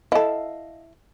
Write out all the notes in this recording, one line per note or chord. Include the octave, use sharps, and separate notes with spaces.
E4 A4 D#5 F5